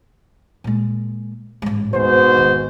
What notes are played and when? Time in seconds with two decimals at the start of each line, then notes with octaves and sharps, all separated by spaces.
0.64 A#2 G#3
1.62 A1 G#2
1.93 D1 G#1 G#2 B2 C5
2.37 G#1 D#2